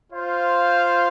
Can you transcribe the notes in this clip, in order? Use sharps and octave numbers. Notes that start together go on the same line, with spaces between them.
F4 C5 F5